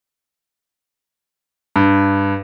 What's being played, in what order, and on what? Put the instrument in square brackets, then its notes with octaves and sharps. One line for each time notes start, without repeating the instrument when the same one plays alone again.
[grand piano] G2